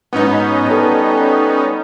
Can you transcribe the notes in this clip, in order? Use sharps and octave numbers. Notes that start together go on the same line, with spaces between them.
G#2 F#3 B3 C#4 D#4
G3 A4